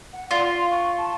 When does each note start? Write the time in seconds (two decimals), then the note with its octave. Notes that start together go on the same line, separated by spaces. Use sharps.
0.13 F#5
0.31 F4 D5
0.45 C6
0.71 C#6
0.98 A5